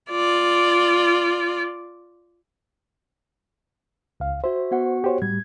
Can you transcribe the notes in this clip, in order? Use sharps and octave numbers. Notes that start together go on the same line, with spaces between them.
F4 D5
C#2 F5
F#4 C5 E5
B3 F#4 F#5
G4 C5 C#5
A2 G3 G#6